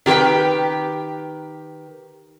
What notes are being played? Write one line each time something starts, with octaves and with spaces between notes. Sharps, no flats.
D#3 G4 A#4 B4 G5